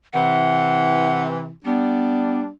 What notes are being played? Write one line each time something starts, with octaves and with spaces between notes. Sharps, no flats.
C3 E3 F#5
G3 B3 D4